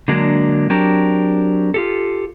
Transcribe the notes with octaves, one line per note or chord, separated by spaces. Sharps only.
D3 F#3 G#3 A#3 D4
F#3 C4 D4 G4 A#4
F4 G4 A4